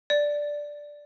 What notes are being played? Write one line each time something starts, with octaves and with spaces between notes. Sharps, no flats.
D5